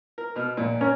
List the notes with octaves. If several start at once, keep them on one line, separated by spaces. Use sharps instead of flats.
A#4
B2 B3 F6
A#1 A#2
C#4 A#4